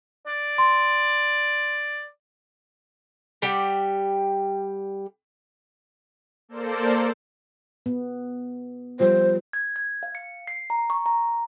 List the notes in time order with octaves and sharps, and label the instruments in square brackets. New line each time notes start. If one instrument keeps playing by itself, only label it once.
[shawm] D5
[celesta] C6
[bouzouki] G3 G4 F#5
[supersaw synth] A#3 A4 A#4 C5 D5
[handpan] B3
[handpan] F3 G3 F4 [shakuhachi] C5
[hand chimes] G#6
G#6
F5
C#7
C7
A#5
C#6
A#5